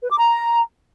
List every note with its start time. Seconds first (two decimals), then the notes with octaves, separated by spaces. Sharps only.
0.03 B4
0.11 D6
0.18 A#5